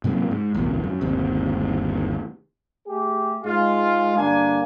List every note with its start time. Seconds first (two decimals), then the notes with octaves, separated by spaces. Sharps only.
0.04 G#2 C3 F#3 A#3
0.31 G#2
0.55 D1 G#1 E2 B2
0.84 F#2
1.01 G1 D#2 C3
2.87 A3 G4 G#4
3.44 G#2 G#3 F4
4.16 G2 D3 A#3 D4 G#5